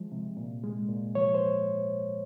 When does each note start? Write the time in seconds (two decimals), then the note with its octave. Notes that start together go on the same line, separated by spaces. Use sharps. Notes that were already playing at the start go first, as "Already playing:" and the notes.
Already playing: F3 G#3
0.12 C3
0.37 A#2
0.64 G#3
0.89 A#2
1.15 F3 C#5
1.34 C5